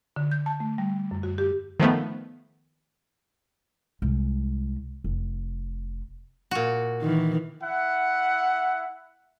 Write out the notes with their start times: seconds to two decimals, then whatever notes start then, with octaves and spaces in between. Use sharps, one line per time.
0.16 D3
0.31 G6
0.46 A5
0.60 A3
0.78 G3
1.11 F#2
1.23 F#4
1.38 G4
1.80 D#3 F3 A3 B3
4.02 C2 G#3
5.04 F1
6.51 A#2 F#4
7.02 D#3 E3
7.61 E4 E5 F#5